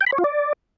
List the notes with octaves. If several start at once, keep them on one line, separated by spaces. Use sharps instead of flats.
G5
B5
C#5
F4
D5